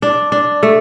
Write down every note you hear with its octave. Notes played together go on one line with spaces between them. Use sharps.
D4
D4
A3